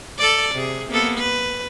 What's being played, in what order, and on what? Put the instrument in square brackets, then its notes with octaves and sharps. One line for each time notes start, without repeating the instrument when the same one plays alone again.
[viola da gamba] A4 D5
C3 G#4
A#3 B3 A4
B4